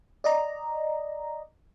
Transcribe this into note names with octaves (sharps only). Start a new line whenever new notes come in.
D5 D#5 A#5